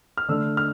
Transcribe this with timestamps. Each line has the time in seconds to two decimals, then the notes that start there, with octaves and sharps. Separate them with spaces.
0.17 F6
0.28 D3 A3 D4 E6
0.57 F6